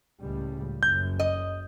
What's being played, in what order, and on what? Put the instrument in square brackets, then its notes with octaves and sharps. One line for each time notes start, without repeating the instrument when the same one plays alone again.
[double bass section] C#2 A2 G3
[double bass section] F#1 F#2 [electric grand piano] G6
[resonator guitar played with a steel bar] D#5